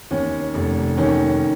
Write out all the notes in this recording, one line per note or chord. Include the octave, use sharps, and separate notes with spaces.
D#2 C#4
F1
D#3 C#4